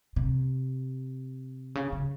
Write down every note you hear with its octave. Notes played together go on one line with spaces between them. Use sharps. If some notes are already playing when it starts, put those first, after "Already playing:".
C3
C#3
C#3